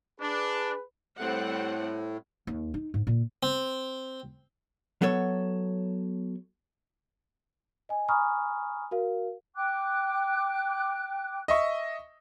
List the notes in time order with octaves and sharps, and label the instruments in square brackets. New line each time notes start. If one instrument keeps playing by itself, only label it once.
[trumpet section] D4 [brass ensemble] G#4 B4
[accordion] A2 [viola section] G3 C4 F#5
[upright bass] D#2
D#4
G#2
A#2
[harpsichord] C4
[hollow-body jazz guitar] F#3 B3 A4 C#5
[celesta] D#5 G#5
G#5 A#5 B5 C#6 D#6 F6
F#4 A#4 F5
[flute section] G5 D6 F#6
[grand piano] D#5 E5 C#6